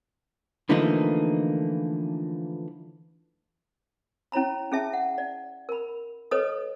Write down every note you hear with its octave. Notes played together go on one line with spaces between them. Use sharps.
D3 E3 F3 A3 A#3 D#4
C#4 E4 C#5 A#5 B5
C#4 G#4 E5 A5
F#5
D5
A#4 B5
A4 B4 C#5 D#5 D#6